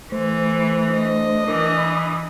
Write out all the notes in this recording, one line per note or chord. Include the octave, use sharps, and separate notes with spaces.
E3 A3 C5
D4 D#5
E3 A#4 D6
B5 D#6